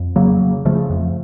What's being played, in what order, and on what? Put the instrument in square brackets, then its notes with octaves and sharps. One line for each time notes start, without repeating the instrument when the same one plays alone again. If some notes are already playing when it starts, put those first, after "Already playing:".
Already playing: [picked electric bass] F2
C#3 F#3 A#3
C#3
C#3 F3 A3
F2